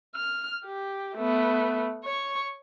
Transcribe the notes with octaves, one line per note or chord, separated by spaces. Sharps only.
F6
G4
A3 B3
C#5 C#6